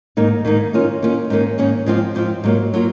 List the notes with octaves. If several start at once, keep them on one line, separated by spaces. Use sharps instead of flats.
G#2 D#3 A#3 D#4
G#2 D#3 A#3 D#4
D#3 A#3 C#4 F4
D#3 A#3 C#4 F4
G#2 D#3 A#3 C#4
G#2 D#3 A#3 C#4
G#2 F3 C4 F4
G#2 F3 C4 F4
G#2 F#3 A#3 F4
F#3 A#3 F4